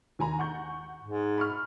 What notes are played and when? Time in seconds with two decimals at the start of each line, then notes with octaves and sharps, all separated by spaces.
0.19 D#2 G#5 A#5
0.39 F#5 C#6 G6
1.03 G#2
1.38 B5 C#6 F6